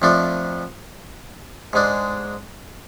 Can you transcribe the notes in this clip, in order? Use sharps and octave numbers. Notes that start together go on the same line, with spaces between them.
F2 F3 A3 D4
G#2 G#3 D4